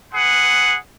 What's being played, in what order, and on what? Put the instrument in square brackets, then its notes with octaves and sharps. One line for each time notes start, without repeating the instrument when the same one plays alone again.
[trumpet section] G#4 B4 F#5